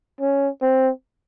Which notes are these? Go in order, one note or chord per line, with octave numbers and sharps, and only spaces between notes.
C#4
C4